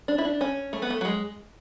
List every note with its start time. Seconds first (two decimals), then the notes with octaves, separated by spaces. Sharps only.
0.08 D4
0.18 E4
0.25 D4
0.41 C#4
0.73 A3
0.82 B3
0.90 A3
1.01 F#3
1.05 G#3